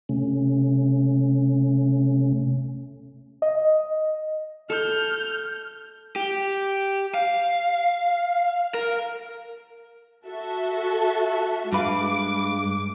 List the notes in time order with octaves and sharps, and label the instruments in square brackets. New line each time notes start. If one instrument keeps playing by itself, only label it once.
[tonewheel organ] C3 A3 C#4
[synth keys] D#5
[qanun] A4 [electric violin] F6 G6
[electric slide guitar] G4
F5
A#4
[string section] F#4 A4 E5
[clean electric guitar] G2 B4 F5 [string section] G#3 D6